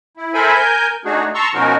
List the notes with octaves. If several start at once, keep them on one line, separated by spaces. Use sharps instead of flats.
E4
A4 A#4 C5 E5 G#5 B5
A#4 G#5 G6
A3 D4 D#4 F#4 G#4
A5 A#5 C6 C#6 E6
B2 F3 C#4 D#4 F#4 A#4